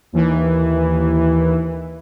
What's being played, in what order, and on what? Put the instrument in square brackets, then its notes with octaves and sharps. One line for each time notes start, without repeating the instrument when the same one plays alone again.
[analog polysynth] D#2 E3